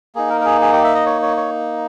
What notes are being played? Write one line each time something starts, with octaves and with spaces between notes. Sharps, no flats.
A#3 D#4 G#4
A#4
A#4
G#4
G#4
G4
E5
D#5
C#5
C#5
C#5